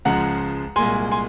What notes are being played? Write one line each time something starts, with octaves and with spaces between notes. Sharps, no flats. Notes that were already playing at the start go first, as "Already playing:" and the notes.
C#2 C#3 F3 G#3 F#5 A#5
C2 A#2 G#3 G#5 C6
G#5 C6